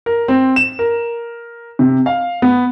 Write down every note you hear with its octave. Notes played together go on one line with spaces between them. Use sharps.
A#4
C4
E7
A#4
C3
F5
B3